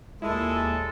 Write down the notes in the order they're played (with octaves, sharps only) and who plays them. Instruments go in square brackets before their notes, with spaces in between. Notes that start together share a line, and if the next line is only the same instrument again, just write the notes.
[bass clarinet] D#2 [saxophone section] A#2 G#3 [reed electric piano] E4 [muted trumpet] A4